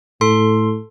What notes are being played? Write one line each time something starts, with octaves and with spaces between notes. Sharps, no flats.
A2 A4 C6